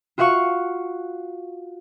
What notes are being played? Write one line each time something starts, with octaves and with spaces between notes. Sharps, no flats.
F4 F#4 F5 F#5 C#6